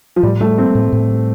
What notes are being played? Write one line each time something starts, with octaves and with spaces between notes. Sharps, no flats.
F3
A2 G3
G3 A3
A#3 C4
A2
A2
G3